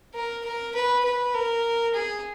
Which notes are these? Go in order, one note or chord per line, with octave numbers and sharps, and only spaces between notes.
A#4
A#4
B4
B4
A#4
G#4